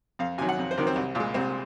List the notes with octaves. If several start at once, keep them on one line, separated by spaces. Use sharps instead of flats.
F2 F5
C3 D#3 F#3 G#5
F#5
F2
C5
C3 D#3 F#3 A#4
C4
C2
A#2
G#3
C2 C4